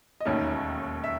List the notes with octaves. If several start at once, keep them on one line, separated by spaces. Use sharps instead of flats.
D#5
E1 D#2 D#3 A3 C#4 C#5
E5